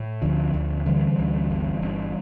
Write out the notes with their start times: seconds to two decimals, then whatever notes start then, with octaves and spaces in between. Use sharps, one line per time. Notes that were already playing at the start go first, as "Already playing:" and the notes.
Already playing: A2
0.22 D2 D3 F3
0.54 D2
0.86 D3 E3 G3
1.19 D2
1.50 G1
1.82 G1